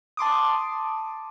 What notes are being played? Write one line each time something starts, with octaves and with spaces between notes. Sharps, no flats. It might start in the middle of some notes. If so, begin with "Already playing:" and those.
A5 C6 D6 D#6